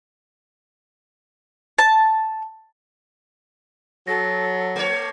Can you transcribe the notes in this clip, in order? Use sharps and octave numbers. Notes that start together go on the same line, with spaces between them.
A5
F#3 A4 A#6
A3 C#5